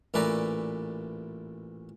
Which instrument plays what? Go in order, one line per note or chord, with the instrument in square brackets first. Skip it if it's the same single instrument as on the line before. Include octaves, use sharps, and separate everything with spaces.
[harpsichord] A1 A#2 A3 B4 D5 A#5